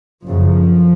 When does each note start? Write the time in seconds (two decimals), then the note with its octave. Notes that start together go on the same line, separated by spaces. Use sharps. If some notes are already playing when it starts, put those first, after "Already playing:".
0.24 F#1 F#2 C#3 F3